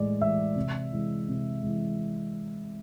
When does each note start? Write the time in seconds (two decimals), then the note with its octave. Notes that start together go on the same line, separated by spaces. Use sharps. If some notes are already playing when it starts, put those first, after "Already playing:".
Already playing: A2 E3 G#3 D5
0.21 E3 G#3 E5
0.56 C3
0.92 E3 G#3
1.28 C3
1.63 E3 G#3